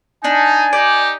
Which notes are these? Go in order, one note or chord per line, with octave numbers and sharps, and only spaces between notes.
D4 D#4 G#5
D#4 G4 D5